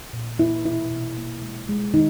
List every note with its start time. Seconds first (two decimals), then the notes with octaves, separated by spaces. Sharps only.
0.13 A#2
0.39 A#3 E4
0.65 B2 E4
0.91 B2
1.17 A#3
1.42 G#3
1.69 G#3
1.94 D#3 D#4